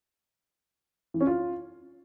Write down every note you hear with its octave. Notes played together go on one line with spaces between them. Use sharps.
E3
C#4
F4